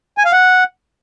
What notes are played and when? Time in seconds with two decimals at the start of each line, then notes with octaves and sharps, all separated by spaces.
0.18 G#5
0.25 F5
0.32 F#5